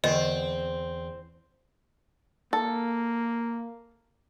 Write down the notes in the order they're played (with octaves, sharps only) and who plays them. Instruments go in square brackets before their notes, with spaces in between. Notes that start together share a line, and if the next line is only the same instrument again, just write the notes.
[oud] E2 [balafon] D3 B4 [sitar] C4 [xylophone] D#5
[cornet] A#3 [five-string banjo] A4